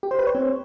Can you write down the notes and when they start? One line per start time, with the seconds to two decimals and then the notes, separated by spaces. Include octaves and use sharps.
0.03 G4
0.11 C5
0.19 B4
0.27 C#5
0.35 C4